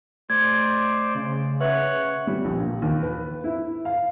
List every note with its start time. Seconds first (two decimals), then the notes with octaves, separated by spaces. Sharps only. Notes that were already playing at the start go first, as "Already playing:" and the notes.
0.30 A3 C5 D5 G#6
1.15 C#3
1.61 B4 C#5 E5 F#5
2.27 G3
2.44 A#1
2.60 A#2
2.82 D#2
3.03 B4
3.44 E4
3.85 F5